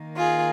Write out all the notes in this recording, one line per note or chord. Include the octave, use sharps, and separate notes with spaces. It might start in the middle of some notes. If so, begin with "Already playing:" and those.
Already playing: D#3 A#3
F4 G#4